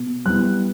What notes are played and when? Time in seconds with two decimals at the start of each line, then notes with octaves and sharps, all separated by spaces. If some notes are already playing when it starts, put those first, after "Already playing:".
Already playing: B2
0.25 G3 B3 E4 F#6